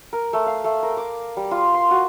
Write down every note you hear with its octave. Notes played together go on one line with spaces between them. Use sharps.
A#4
A3
F5
A3
A#4
D6
G3
F4
C6
F#4